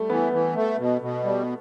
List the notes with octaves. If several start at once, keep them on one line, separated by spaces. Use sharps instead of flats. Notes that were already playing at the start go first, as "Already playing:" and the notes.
Already playing: G3 A3
E3 B3
E3
A3
B2
B2
G3